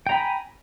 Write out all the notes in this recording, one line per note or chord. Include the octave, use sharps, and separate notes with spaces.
G5 G#5 A#5 B5